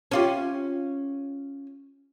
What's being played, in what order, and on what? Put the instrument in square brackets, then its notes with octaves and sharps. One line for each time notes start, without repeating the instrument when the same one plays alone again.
[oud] C#4 F4 G4